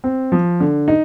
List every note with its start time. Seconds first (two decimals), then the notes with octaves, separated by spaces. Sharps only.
0.04 C4
0.32 F3
0.60 D3
0.88 D#4